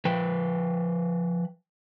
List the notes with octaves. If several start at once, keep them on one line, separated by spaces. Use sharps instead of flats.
F3 B4 G5